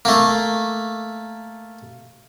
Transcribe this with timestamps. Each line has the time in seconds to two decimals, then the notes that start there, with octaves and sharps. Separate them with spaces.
0.05 A3 A#3